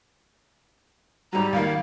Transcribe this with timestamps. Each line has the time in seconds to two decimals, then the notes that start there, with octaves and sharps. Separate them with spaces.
1.33 G#2 F#3 G3 A#5
1.53 C#2 D#3 A#3 F5